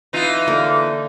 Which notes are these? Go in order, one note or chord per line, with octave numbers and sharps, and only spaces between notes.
E3 D#4 F4
D3 A#3